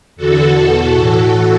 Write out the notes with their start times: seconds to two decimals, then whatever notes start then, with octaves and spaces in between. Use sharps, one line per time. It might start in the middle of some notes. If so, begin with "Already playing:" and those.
0.16 E2 D3 F#4 A4
0.55 E2 B2
0.92 A2 E3